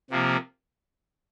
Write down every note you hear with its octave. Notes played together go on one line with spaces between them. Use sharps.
C3 F3 A#3